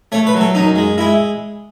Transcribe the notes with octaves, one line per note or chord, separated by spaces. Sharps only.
A3 C#5
B4
F#3
A4
F#2 D#4
G#3
G#3 E4